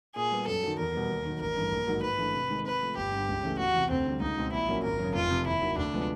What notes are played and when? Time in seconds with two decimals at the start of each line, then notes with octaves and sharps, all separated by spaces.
0.15 A#2 G#4
0.31 G3 B3
0.47 F#2 A4
0.63 D#3 F#3
0.78 E2 A#4
0.93 B2 G3 B3
1.09 D#2
1.26 D#3 F#3
1.41 A1 A#4
1.56 G2 E3 A3
1.72 A#1
1.87 G#2 D#3 F#3 A#3
2.02 G#2 B4
2.18 E3 A3 D4
2.34 C3
2.50 D#3 G#3
2.65 C3 B4
2.81 F3 A3
2.97 G1 G4
3.12 G2 D3
3.28 C#2
3.43 C#3 E3 A3 C#4
3.59 E2 F#4
3.74 C3 E3
3.90 D2 C4
4.06 D3 G3
4.21 C#2 D#4
4.37 B2 G#3 C4
4.52 A#1 E4
4.68 A#2 F#3 A#3 C#4
4.83 G#1 A#4
4.99 F#2
5.04 C#3
5.15 F1 F4
5.31 F2 C3 F3
5.46 D#2 E4
5.61 D#3 F#3
5.78 D2 D4
5.93 C3 F3 G#3 B3